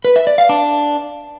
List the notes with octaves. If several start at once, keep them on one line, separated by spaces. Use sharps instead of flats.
B4
E5
D5
F5
D4